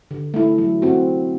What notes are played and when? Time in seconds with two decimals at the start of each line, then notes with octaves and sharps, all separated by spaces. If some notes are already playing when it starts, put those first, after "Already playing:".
0.11 D3
0.34 A3 E4
0.58 F#3
0.82 C4 F#4